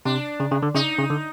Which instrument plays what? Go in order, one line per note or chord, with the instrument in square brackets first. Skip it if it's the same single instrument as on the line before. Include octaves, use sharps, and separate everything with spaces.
[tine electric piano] C3 [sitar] D4
[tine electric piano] C#3
C#3
D3
[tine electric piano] C#3 [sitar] D#4
[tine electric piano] C#3
D3